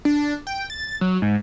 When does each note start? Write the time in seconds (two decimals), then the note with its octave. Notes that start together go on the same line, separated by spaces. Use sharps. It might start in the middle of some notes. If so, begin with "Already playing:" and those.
0.05 D4
0.47 G5
0.70 A6
1.01 F#3
1.22 G#2